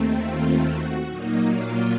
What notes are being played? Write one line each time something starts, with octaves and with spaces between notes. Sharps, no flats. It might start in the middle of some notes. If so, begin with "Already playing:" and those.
Already playing: D#2 D#3 A3 C4
F4
F#4
A#2 F#3 A#3 D#4
F4